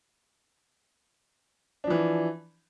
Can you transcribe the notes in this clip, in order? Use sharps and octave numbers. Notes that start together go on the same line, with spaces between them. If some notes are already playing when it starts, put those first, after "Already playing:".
E3 F3 D4